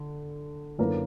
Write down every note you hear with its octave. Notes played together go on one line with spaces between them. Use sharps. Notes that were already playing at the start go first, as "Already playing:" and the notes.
Already playing: D3
F#2 D3 A#3 E4 B4